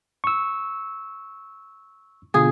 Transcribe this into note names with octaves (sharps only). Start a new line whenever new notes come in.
C#6 E6
B2 D3 F4 G#4